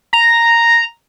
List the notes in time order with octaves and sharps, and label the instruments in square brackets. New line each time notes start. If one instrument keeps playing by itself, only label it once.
[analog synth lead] A#5